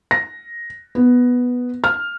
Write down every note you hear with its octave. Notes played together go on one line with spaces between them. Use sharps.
A#6
B3
F6